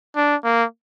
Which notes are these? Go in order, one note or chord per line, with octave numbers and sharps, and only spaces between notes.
D4
A#3